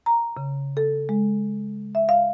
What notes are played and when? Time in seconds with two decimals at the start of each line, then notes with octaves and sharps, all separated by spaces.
0.06 A#5
0.37 C#3
0.77 A4
1.09 G#3
1.95 E5
2.09 F5